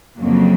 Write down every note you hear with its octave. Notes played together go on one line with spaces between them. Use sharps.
F2 C#3 F#3 A#3